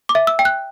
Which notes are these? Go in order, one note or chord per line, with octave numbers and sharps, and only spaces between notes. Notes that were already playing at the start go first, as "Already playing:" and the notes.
D6
E5
E6
G5
F#6